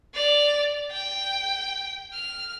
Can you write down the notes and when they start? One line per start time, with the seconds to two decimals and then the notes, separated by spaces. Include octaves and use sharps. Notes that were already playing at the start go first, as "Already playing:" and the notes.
0.14 D5 F7
0.92 G5
2.13 F6